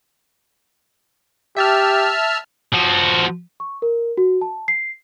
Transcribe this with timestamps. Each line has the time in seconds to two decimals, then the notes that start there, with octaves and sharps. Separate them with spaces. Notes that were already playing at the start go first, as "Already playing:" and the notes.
1.57 G4 E5 A5 F6
2.74 F3 F#4
3.60 C#6
3.82 A#4
4.18 F#4
4.41 A5
4.68 C7